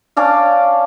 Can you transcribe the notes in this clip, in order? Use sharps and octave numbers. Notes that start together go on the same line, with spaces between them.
C#4 D4 D5 F5